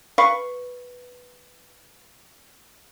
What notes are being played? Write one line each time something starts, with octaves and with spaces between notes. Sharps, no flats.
B4 F5 C#6